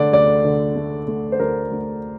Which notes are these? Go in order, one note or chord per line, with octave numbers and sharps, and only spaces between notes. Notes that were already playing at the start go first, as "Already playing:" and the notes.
Already playing: D3 A3 D5
D2 D5
D3
A3
A3
C5
D2 A#4
D2